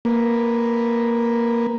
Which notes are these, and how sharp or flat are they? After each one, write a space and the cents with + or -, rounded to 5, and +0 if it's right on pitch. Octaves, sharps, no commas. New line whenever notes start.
A#3 +0 B4 +0